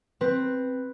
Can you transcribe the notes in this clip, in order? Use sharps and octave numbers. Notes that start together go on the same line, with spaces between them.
C4 B4